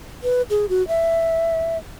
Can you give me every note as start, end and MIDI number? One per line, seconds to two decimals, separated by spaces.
0.23 0.42 71
0.50 0.66 68
0.69 0.86 66
0.88 1.78 76